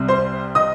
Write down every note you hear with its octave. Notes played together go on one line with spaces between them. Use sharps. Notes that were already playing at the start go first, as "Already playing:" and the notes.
Already playing: C2 C3 G3 C4
C5 C6
D#5 D#6